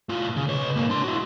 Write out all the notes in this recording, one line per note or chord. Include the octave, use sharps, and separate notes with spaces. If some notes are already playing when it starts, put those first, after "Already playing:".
A2 F4
C#3
B4 C#5
G#2 A#3
D4 C6
E4 F#4